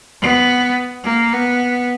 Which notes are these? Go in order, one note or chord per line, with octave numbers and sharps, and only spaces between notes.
B3
A#3
B3